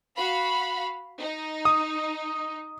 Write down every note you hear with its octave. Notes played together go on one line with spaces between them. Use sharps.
F#4 F5 B5
D#4
D#6